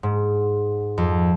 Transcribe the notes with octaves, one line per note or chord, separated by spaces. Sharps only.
G#2
F2